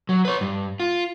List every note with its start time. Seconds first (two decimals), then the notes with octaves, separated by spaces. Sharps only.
0.09 F#3
0.25 B4 C#5
0.41 G2
0.80 F4